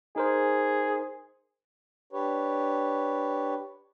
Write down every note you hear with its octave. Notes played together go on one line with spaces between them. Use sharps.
D#4 G#4 A#4 C5
D4 G4 B4 C#5